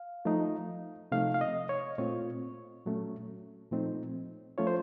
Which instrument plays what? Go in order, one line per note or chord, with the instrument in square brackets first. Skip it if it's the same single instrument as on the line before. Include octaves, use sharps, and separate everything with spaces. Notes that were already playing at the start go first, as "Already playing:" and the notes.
Already playing: [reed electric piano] F5
F3 A3 D#4
C3 F3 A3 D#4 F5
F5
D#5
C#5
A#2 A3 C4 F4 C#5
A#2 F#3 A3 C#4
A#2 F3 A3 C4 D#4
F3 A3 C#4 F4 C#5
C5